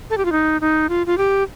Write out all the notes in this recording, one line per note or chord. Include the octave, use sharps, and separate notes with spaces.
A4
G4
F4
D#4
D#4
F4
F4
G4